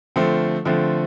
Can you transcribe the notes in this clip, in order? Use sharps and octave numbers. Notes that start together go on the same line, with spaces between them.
D3 F3 A3 C4
D3 F3 A3 C4